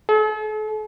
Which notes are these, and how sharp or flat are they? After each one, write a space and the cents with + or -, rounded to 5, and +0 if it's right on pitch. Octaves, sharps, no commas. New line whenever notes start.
A4 -45